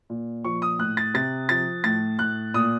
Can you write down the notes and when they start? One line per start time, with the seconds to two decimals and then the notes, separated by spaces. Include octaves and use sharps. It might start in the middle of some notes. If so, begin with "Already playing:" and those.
0.10 A#2
0.45 F3 C#6
0.62 D#6
0.79 A2 F#6
0.97 A6
1.14 C3 A6
1.49 F3 A6
1.84 A2 A6
2.19 A2 F#6
2.54 A#2 D#6